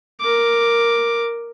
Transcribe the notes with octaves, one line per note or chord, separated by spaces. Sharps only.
A#4 D6